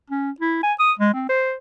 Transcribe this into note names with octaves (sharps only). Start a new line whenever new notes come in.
C#4
E4
G#5
D#6
G#3
C4
C5